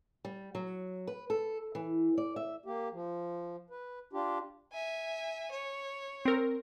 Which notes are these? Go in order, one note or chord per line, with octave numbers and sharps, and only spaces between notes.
G3
F#3
B4
A4
E3
D5
E5
A#3 G4
F3
B4
D4 F4 G4
E5 G#5
C#5
C4 A#4